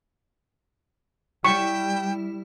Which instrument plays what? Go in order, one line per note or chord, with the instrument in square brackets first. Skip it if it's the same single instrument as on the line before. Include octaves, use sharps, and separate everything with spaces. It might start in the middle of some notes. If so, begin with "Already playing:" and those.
[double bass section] G3 [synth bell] E4 [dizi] G5 [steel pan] C#6